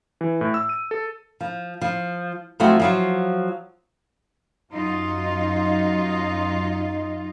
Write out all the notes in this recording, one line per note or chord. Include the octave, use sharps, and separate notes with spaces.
E3
A2
E6
D#7
A4
F3
F3
F3 F#3 A3 C4 F4 F#4
F3 F#3 F4
F#2 F#3 D#4 F4